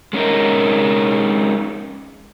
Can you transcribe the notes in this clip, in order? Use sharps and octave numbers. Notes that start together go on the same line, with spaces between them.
G#3 C#4 D#4 A#4